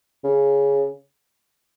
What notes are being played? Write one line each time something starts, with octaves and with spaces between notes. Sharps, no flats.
C#3